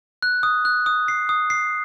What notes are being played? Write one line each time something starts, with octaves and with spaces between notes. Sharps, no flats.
F#6
D#6
F#6
D#6
C7
D#6
C7